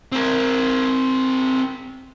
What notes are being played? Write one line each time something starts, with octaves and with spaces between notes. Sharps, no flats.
C4 A#4